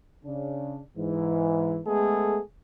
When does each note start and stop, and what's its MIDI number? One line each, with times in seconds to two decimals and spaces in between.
0.25 0.81 49
0.25 0.81 62
0.97 1.79 44
0.97 1.79 52
1.86 2.40 56
1.86 2.40 57
1.86 2.40 59
1.86 2.40 68
1.86 2.40 69